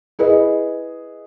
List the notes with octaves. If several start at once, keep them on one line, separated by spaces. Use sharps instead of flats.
E4 G#4 B4 D#5